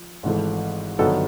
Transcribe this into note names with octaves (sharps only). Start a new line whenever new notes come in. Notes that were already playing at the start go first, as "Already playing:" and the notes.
Already playing: F3
G#1 G#2 E3 A3
G1 G2 D#3 F#3 B3 A4